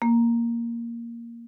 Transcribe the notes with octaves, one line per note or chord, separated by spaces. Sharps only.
A#3